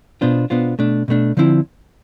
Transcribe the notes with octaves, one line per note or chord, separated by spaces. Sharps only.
B2 B3 D4 F4 C5
B2 B3 D4 F4 C5
B2 A3 D4
B2 A3 D4
D3 F3 C4 E4